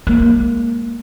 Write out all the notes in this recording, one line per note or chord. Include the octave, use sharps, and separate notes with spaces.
G#3 A#3